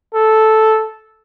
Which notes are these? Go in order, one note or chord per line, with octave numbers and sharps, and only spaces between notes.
A4